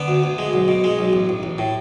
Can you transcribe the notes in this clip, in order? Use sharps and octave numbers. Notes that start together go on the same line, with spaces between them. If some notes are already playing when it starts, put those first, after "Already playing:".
Already playing: D3 B3
D2
D2
G#3
B1
B2
G#3
B1
A1
A1
A1
A2